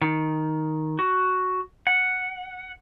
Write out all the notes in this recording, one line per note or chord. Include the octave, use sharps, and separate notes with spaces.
D#3
F#4
F#5